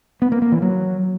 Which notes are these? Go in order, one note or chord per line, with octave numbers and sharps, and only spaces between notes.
B3
A#3
A#3
E3
F#3